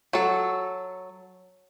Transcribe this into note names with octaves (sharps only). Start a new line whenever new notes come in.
F#3 A4